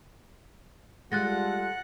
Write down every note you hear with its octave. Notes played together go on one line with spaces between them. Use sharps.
G3 G#3 F4 A4 F#5 F#6 A6 A#6